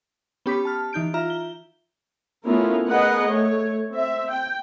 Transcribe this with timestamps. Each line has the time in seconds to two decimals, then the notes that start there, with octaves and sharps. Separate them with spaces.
0.46 B3 C#4 G4 B5 D6 B6
0.65 A5 F6
0.93 E3 D#4 G6 D7
1.14 F4 E5 A#5 F6
1.30 G7
2.44 A3 B3 C#4 E4 F4 A#4
2.88 B3 G#4 A#4 B4 D#5 F#5
3.28 A3 C#5
3.90 C4 E5
4.30 G5